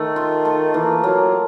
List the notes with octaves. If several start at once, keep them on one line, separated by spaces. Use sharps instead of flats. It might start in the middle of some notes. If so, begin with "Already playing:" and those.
Already playing: D#3 A3
F4
A3
E3 A#3
F#3 A#3